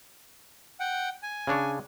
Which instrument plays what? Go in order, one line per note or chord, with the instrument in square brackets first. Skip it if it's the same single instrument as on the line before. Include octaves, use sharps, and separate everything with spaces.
[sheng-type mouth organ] F#5 G5
G#5
[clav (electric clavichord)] C#3 D4 C#5